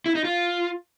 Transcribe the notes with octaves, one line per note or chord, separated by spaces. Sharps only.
E4
D#4
F4